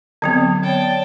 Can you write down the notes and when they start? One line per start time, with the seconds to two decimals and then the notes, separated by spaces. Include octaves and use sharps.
0.22 D3 F#3 B3 C4
0.64 C#5 D5 G5 A5